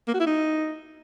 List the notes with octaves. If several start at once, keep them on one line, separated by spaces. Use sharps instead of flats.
A#3
F#4
E4
D#4